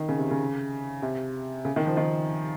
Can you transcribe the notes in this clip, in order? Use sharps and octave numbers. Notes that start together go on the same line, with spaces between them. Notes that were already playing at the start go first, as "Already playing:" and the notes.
Already playing: D#3
C#3
C3
C#3
C3
C#3
D#3
F3
D#3